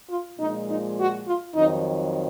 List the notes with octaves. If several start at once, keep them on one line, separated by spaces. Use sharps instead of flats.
F4
A#2 F3 G#3 D#4
D#4
F#4
F4
F2 D#3 F#3 D#4